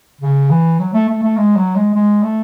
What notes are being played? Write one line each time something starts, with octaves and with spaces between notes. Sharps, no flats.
C#3
E3
F#3
A3
A3
A3
G#3
F#3
G#3
G#3
A3